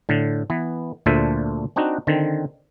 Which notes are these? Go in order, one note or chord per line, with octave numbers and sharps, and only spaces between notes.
A2 D3
E3 B3
D2 A#2 D4 A4 C5 E5
C4 D4 D#4 F#4
D3 D#3 C4